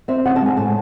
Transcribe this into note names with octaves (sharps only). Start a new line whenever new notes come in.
C4 E5
C#3 F#5
A5
G#3 G#5
A2 A5